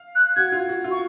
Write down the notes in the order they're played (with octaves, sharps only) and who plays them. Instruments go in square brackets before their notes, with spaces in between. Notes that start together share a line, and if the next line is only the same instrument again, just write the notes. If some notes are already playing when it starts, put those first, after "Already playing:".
Already playing: [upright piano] F5
[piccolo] F#6
[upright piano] F#4 [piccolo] G#6
[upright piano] F4
F#4
F4
[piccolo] C#6